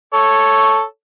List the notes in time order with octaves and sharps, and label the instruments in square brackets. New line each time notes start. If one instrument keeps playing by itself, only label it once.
[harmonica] A4 C#5